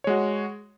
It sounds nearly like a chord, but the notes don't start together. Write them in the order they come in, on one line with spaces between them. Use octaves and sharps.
C#5 G#3 F#4